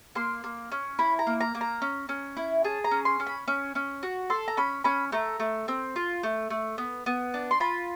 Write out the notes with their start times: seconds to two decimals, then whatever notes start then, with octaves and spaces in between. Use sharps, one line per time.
0.15 A#3 C6
0.44 A#3
0.72 C#4
0.99 E4 B5
1.19 A#5
1.27 A#3
1.41 A#5
1.55 A#3
1.61 A#5
1.82 C#4
2.09 C#4
2.37 E4
2.64 G#4 A5
2.84 A#5
2.91 C#4
3.05 C6
3.20 C#4
3.27 B5
3.48 C#4
3.75 C#4
4.03 F#4
4.30 A4 C6
4.48 A#5
4.57 C#4 B5
4.84 C#4 B5
5.12 A3 A#5
5.40 A3
5.68 C4
5.96 F4
6.23 A3
6.50 A3
6.78 B3
7.06 B3
7.34 D4
7.51 C6
7.60 F4 B5